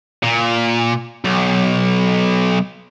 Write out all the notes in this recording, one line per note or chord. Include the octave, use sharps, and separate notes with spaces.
A#2
B1